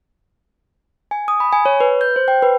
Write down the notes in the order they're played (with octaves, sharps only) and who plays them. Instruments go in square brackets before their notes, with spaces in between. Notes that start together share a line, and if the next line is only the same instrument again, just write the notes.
[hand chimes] G#5
D#6
B5
G#5
C#5
B4
G6
C5
G5
B4